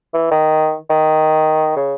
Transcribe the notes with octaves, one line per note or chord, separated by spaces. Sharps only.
E3
D#3
D#3
C#3